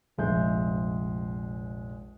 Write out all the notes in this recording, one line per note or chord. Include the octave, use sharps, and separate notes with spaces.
F1 A#1 G#3 E5 G6